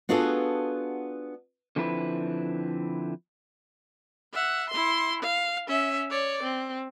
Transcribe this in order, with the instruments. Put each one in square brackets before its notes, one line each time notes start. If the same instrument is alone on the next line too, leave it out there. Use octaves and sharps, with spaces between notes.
[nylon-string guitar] B3 D4 F4 F#4 G#4 A4
[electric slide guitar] D3 F3 C4 E4 B4
[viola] E5 F#5
E4 C6
F5
C#4 E5
C#5 D5
C4